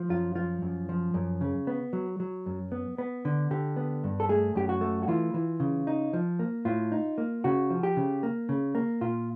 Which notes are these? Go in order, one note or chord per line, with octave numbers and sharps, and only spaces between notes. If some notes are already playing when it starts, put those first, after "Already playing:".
Already playing: F3
F#2 F4
F3 F4
F#2
F3
F#2
C#3
B3
F#3
F#3
F#2
B3
B3
D3
D3 G4
B3
G2
A4
A3 G#4
F#2 G4
F#4
A3
F#4
E3 F4
E3
C#3
D#4
F3
A#3
A2 F4
D#4
A#3
C#3 F#4
F3
G4
C#3
A#3
C#3
A#3
A#2 F4